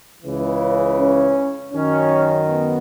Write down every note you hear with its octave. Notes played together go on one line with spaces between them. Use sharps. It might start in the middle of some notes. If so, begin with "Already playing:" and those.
C#2 C#3 E3
C#4
F#2 D#3 C#4
B3